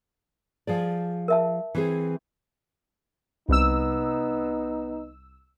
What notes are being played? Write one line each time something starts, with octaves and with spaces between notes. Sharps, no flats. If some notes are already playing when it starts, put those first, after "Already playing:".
F3 G#4 D5
A#4 E5 A5
E3 C4 G#4
C2 B3 D#4 E6